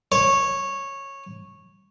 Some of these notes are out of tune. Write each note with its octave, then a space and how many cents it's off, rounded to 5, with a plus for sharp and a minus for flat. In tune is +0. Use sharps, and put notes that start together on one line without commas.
C#5 -10